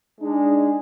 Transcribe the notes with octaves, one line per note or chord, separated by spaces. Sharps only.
G#3 D4 D#4